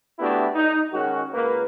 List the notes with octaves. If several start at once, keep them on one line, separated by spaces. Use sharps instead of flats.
A3 B3 D4 E4 F#4 G4
D#4
D#3 G#3 C#4 F#4
C#2 A#3 B4